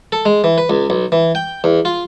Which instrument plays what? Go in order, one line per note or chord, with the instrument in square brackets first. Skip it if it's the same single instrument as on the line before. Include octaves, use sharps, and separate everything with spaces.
[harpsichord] A4
G#3
E3
B4
C#2
B1
E3
G5
E2
F4